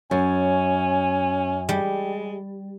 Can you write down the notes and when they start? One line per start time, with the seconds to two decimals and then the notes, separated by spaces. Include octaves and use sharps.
0.11 F#2 C#4 G#5
1.69 G3 G#3